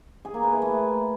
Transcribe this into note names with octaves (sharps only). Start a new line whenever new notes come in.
G#4
A#3
B4
E4
A3